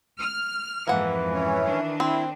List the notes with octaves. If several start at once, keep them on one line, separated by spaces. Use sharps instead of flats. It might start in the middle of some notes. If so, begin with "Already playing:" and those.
F6
F2 G#2 E3 A#3 F#5
C#4 C#5
D#3 D4
C4 E4